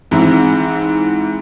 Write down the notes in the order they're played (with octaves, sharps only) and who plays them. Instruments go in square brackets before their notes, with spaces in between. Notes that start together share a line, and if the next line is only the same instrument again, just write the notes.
[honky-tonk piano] G#2 E3 C4